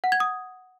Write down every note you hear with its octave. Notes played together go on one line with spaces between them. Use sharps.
F#5
G#6
D#6